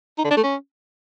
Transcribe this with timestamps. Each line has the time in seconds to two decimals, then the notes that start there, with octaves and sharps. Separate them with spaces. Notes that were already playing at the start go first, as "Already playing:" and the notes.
0.18 D#4
0.24 D3
0.31 D4
0.37 A3
0.43 C#4